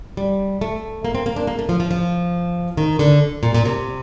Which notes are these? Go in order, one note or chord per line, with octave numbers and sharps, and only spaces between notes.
G3
A3
A#3
C4
A#3
D4
A#3
A3
F3
F3
F3
D#3
D3
A#2
A#2
C3